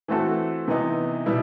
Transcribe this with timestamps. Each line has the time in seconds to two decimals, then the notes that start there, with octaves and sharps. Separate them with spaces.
0.08 E3 A3 C4 F#4 A4
0.68 C3 E3 B3 D#4
1.26 B2 G3 B3 E4